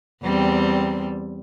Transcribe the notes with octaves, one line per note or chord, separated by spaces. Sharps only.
E2 G3 C4